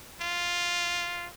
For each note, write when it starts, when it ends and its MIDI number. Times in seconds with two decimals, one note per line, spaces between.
0.21 1.28 65